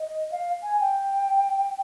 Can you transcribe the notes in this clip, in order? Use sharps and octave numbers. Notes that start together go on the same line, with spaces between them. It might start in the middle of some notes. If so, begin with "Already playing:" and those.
Already playing: D#5
F5
G#5
G5